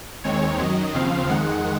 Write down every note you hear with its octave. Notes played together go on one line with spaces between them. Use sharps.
D#2 D#3 G#3 C4 C#5
F#2 D#3 F#3 D#5
D#2 C#3 F3 C4 F5
F2 D#3 G#3 F#5